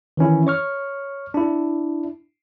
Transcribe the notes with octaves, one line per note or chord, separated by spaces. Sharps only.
D#3 E3 C#4 E4
C#5 C#6 F6
D4 E4